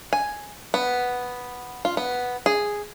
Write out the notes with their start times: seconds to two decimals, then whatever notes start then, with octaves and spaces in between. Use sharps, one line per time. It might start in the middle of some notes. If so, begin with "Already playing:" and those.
0.13 G#5
0.74 B3
1.85 F4
1.97 B3
2.46 G#4